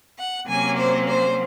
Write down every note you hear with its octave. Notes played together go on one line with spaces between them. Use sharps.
F#5
C3 F#3 A#3 C#4 G#5
C5
C5